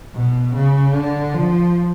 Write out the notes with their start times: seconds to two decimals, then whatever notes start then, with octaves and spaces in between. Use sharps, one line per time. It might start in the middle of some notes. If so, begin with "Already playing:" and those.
0.14 B2
0.54 C#3
0.94 D3
1.34 F3